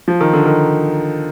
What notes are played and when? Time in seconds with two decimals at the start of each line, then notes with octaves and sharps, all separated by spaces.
0.08 F3
0.21 D#3
0.33 D3
0.46 D#3